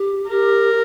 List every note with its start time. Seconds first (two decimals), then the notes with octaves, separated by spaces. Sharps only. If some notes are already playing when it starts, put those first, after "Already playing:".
Already playing: G4
0.30 G4 A#4